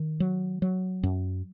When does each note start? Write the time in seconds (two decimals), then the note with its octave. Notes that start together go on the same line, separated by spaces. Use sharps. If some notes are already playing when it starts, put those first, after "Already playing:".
Already playing: D#3
0.20 F#3
0.62 F#3
1.03 F#2